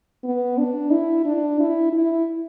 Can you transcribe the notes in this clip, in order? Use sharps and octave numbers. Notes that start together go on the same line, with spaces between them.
B3
D4
E4
D4
E4
E4